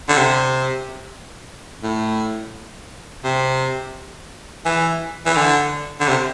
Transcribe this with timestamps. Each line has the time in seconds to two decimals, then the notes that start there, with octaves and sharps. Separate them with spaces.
0.09 D3
0.18 C3
1.83 A2
3.24 C3
4.66 E3
5.26 E3
5.37 D3
6.00 D3
6.08 C3